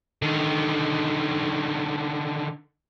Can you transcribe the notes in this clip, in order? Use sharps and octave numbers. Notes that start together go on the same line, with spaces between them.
D3 D#3